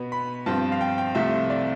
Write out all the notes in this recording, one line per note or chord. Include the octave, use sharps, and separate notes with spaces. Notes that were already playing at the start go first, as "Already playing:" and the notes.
Already playing: B2 B3
B5
G2 F3 C4 A5
F5
G5
G5
C2 C3 F3 A3 E5
D5